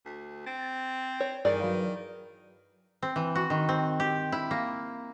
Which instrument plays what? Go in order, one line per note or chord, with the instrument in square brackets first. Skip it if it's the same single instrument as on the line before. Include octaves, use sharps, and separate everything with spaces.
[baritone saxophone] D2
[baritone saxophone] C4 [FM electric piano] A6
[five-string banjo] C#5
[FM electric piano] G2 [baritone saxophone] D#3 [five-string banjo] E3 G#4 D5
[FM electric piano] F#3 B4 F5
[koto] C4
E3
F#4
D#3
C4
G4
E4
A#3